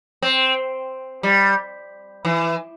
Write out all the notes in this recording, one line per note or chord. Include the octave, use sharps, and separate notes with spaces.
C4
G3
E3